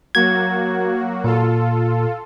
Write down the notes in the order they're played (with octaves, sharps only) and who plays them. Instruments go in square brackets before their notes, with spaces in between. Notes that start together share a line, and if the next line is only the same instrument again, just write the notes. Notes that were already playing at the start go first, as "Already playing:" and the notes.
[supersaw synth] F#3 A#3 F#4 [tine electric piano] G#6
[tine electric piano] A#2 [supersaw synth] F4 A4